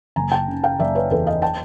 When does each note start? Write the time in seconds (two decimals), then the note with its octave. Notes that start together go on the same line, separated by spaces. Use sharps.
0.16 F#1 G#5 A#5
0.32 G5 A5
0.48 C#3
0.63 F5 G5
0.79 F#1 D5 E5
0.95 B4 C#5
1.11 E2 A4 B4
1.27 D#5 F5
1.42 G5 A5